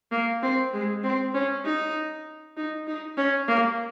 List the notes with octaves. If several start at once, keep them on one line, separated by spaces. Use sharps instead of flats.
A#3
C4
G#3
C4
C#4
D#4
D#4
D#4
C#4
A#3